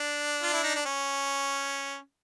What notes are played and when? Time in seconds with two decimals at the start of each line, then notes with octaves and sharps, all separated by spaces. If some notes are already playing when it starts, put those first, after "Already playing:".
Already playing: D4
0.43 F4
0.53 E4
0.64 D#4
0.75 D4
0.86 C#4